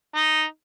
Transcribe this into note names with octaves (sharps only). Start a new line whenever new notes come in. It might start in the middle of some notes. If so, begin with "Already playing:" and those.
D#4